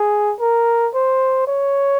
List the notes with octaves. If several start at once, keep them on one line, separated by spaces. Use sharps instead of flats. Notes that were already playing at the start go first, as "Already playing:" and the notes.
Already playing: G#4
A#4
C5
C#5